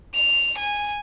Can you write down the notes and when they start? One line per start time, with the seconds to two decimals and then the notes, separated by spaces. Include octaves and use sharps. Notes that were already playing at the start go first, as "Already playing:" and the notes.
0.14 F7
0.58 G#5